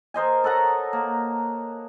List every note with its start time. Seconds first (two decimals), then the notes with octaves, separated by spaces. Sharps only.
0.14 A#4 C5 D#5 G#5
0.44 A4 C#5 F#5 A#5
0.93 A#3